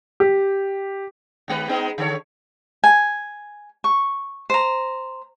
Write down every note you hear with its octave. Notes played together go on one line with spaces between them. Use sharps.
G4
D#2 G#3 B4
G#3 B3 D#4
D3 A4 C#5
G#5
C#6
C5 A#5